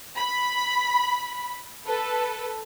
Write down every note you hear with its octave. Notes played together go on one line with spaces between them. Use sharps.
B5
A4 B4